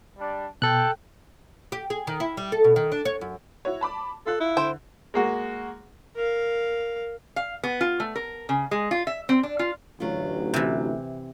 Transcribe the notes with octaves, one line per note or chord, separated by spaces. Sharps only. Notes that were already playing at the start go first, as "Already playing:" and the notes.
G3 D4
B2 A4 G5 F#6
G4
G#4
D#3
E4
G3
A4
B2
D#3
D4
C#5
F#2
E4 F#4 C#5
A5 B5 D6
F4 A4 F5 F#6
E4
D3 C5 G5
G#3 A#3 F#4
A#4 F5
F5
B3
F4
A3
A#4
C#3
G#3
F4
E5
C4
D4
F4
A1 D2 F#3 A3 F4
C3 E3